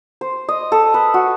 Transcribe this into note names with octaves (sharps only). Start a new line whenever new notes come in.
C5
D#5
A4
B4
F#4